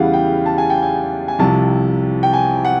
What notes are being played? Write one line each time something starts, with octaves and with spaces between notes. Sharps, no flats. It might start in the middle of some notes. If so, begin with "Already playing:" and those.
Already playing: E2 C#3 E3 G3 F5 F#5
G5
A5
G#5
G5
G#5
G#5
C2 C3 F3 A5
G5
G#5
F#5